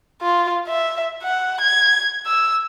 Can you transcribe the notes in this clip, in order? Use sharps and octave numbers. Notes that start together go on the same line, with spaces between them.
F4
E5
F#5
G#6
E6